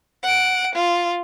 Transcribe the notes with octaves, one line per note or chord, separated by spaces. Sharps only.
F#5 D7
F4